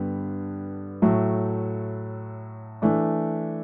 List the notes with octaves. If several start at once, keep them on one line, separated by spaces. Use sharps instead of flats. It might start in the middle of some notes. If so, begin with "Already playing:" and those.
Already playing: G2 D3 G3 B3
A2 F#3 A3
E3 A3 D4